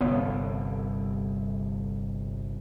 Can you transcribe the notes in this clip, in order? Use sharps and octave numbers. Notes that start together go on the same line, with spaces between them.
G1 C2 D3 B3 C#5